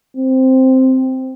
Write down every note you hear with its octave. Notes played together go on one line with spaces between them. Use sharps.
C4